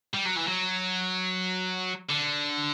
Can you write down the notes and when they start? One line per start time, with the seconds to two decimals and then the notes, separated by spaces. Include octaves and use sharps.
0.14 G3
0.26 F#3
0.37 E3
0.48 F#3
2.09 D3